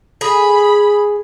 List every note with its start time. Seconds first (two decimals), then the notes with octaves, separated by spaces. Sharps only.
0.21 G#4 B5